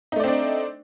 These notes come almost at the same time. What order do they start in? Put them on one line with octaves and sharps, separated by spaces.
D#4 A3 D5 C4 D4